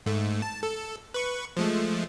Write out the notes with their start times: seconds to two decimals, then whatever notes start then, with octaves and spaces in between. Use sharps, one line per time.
0.06 G#2 A3
0.42 A5
0.63 A4
1.14 B4 C#6
1.57 F3 G#3 A3